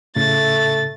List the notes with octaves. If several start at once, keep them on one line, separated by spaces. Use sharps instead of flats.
A2 C#3 A3 A6